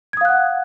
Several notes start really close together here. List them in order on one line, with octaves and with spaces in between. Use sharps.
G#6 D#6 F5 F#6 F#5